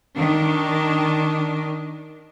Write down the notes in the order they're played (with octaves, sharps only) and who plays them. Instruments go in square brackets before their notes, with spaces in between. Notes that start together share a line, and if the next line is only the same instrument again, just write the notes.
[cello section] D#3 D4